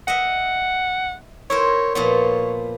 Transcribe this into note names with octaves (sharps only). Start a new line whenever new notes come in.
D#5 E5 F#5
E4 A#4 C5 C#5
A#2 F3 B3 C#5